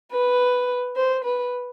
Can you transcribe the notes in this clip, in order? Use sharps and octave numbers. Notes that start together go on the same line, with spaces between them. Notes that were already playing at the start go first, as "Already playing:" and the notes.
B4
C5
B4